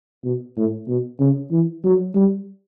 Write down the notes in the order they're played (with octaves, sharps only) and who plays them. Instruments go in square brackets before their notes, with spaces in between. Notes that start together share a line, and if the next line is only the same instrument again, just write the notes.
[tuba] B2
A2
B2
C#3
E3
F#3
G3